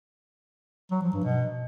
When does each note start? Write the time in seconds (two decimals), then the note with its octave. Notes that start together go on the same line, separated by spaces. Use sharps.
0.91 F#3
1.02 F3
1.13 G2
1.24 B2